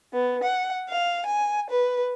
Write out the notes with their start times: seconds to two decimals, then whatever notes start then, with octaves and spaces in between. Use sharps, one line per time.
0.13 B3
0.43 F#5
0.89 F5
1.25 G#5
1.71 B4